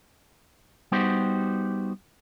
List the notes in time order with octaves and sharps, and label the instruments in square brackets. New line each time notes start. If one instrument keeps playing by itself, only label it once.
[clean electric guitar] G3 B3 D#4 F#4 G4 C5